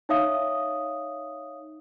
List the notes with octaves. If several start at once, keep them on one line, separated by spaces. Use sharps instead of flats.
D#4 C#5 E5 F5 D#6